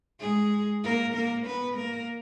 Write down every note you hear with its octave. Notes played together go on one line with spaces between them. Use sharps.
G#3 G#4
A#3 A#4
A#3 A#4
B3 B4
A#3 A#4